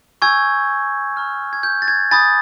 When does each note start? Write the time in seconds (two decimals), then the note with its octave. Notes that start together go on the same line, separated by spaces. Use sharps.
0.22 G#5 C#6 E6 G6 G#6
1.17 A#5 C#6 F6
1.53 G#6
1.63 G6
1.82 A6
1.88 G#6
2.11 G#5 B5 D#6 G6 A6